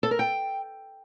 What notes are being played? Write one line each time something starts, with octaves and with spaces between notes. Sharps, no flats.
A4
A#4
G5